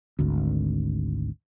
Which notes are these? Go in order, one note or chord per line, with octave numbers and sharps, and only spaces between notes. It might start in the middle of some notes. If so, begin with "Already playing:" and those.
G#1 D2